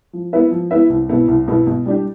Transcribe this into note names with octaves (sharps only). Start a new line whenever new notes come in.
F3
B3 E4 B4 E5
F3
B3 E4 B4 E5
C2
B2 B3 E4
C2
B2 B3 E4
B2
G3 D4 G4